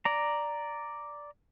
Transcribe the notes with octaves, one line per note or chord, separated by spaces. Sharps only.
D5 A#5